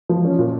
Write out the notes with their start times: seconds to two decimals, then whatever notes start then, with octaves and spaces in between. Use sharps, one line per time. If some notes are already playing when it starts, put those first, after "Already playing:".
0.09 F3
0.24 C#4
0.39 A#2